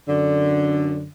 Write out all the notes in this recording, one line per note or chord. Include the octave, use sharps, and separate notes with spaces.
F#2 D3